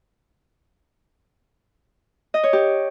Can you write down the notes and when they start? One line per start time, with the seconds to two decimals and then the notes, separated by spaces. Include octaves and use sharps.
2.34 D#5
2.44 C#5
2.53 G4